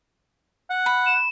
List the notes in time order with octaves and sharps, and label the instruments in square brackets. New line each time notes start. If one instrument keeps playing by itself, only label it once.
[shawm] F#5
[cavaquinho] B5
[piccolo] E7